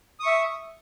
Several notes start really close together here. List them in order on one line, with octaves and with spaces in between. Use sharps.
D#6 C#6 E5